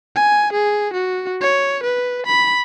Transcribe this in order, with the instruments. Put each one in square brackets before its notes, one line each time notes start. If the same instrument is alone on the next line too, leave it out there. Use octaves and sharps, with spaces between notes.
[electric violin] G#5
G#4
F#4
C#5
B4
B5